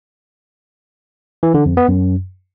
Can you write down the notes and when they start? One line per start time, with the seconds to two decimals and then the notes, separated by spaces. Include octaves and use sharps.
1.43 E3
1.54 D3
1.66 F2
1.77 B3
1.89 F#2